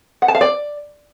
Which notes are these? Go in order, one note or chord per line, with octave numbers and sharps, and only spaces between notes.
F#5
A5
F5
D5